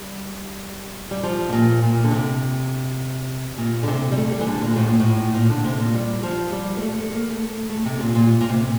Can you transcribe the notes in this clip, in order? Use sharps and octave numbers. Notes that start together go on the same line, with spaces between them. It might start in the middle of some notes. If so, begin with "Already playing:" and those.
Already playing: G3
G3
F3
C3
A#2
A#2
D3
C3
A#2
D3
C3
G3
A3
G3
E3
D3
A#2
A2
A#2
A2
A#2
D3
C3
A#2
G3
F3
G3
A#3
A3
A#3
A3
A3
C3
A#2
A#2
A#2
C3